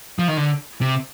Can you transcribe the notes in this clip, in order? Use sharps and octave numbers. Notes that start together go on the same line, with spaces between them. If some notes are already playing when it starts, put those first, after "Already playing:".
F3
D#3
D3
C3